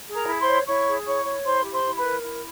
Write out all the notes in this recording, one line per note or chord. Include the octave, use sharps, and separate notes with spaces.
G#4
A#4 A#5
E4
C5 C6
C#5
E4 C#5 C#6
G#4
E4 C#5 C#6
C#5
E4 C5 C6
G4
C5 C6
E4
B4 B5
A#4
E4